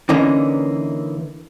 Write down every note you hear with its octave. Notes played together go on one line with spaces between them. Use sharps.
D3 E3 A#3 C#4 D#4